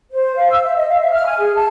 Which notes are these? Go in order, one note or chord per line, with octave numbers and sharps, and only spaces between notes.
C5
F5
E6
E5
D#5
F5
E5
F6
G#5
G#4
A5